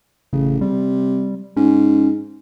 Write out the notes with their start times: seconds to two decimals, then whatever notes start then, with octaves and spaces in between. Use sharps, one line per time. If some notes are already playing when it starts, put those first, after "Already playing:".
0.33 A1 C#3
0.61 C3 G3
1.57 G#2 C#4